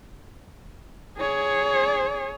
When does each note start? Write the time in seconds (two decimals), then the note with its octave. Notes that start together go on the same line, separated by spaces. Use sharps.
1.18 G#4 C#5